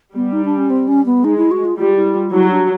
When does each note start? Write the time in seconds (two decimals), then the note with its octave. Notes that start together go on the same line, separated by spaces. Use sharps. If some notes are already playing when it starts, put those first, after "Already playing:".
0.15 G3 B3
0.32 D#4
0.45 D4
0.57 C#4
0.70 C4
0.88 C#4
1.06 B3
1.24 G#3 D#4
1.38 E4
1.51 F#4
1.65 F4
1.78 G3 F4
1.96 E4
2.14 F4
2.32 F#3 E4
2.51 D4